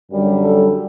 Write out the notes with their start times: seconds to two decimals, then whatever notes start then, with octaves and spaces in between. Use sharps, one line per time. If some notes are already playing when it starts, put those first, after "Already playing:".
0.11 F#2 D3 G3
0.44 A4